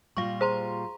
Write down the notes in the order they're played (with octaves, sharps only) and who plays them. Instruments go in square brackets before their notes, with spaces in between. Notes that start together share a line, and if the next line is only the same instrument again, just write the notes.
[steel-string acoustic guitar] A#2 G3 F4 [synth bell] F5 C#6
[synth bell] G#4 A#5 C6 [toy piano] C5